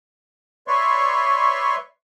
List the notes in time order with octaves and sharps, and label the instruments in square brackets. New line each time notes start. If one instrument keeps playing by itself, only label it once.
[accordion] B4 C#5 D5 E5 C6 C#6